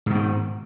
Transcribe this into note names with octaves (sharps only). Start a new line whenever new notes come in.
G#2 B2 D#3